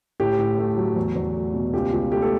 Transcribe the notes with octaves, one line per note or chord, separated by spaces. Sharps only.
A2 G4
A2
A3
F#3
E2
E2
A3
B2
C#2 G4
C#2
A3 G4
A4